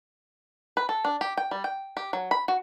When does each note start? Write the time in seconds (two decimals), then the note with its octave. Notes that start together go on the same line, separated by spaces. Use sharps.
0.77 B4
0.89 A4
1.05 D4
1.21 G4
1.37 G5
1.51 G3
1.64 G5
1.97 G4
2.13 F#3
2.31 B5
2.48 F#4